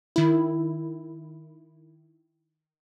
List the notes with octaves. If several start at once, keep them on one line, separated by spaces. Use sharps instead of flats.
D#3 E4